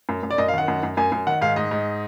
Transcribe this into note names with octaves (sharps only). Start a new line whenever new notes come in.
F#2
F#2
D5
F#2 D#5
F5
D#3 F#5
F#2
F#2
F#2 G#5
F#2
D#3 F#5
G#2 F5
G#2 D#5
G#2